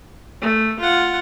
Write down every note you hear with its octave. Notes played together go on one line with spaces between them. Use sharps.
A3
F4 F#5